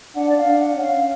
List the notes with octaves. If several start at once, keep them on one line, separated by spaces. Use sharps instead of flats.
D4 F#5
D5
F5
D4
F#5
C#4
F5